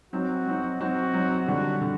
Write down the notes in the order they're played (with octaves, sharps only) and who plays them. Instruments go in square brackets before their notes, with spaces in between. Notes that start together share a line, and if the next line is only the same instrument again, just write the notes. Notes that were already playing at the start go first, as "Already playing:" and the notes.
[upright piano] F#3 C4 D#4 [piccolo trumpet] F#4
[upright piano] F#3 C4 D#4
[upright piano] F#3 C4 D#4 [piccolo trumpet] F#4
[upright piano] F#3 C4 D#4
[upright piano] D3 G3 D4 [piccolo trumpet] F#4
[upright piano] D3